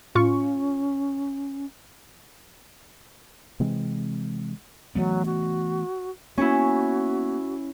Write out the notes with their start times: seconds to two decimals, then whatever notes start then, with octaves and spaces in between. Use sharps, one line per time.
0.15 A2 C#4 F4 C#6
3.60 C3 E3 G#3 C4
4.95 E3 F#3 A3 B3
5.25 F#4
6.38 A#3 B3 C#4 E4 F#4